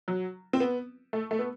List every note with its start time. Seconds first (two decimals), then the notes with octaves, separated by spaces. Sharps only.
0.08 F#3
0.53 C4
0.60 B3
1.13 A3
1.31 A3
1.39 B3